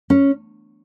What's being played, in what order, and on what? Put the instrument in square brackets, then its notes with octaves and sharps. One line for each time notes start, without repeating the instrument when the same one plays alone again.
[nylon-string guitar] C#4